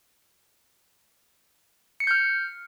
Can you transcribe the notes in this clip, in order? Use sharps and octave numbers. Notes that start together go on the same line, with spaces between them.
F6 G6 C7 C#7